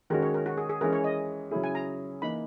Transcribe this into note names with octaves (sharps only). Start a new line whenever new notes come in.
D#3 G#3 C#4 F#4 A#4
C#5
A#4
F#4
G#4
G#4
E3 G#3 C#4 G#4 A#4
C#5
D#5
C#3 F#3 C#4 E4 G#4
G#5
A#5
E3 A#3 D#4 B5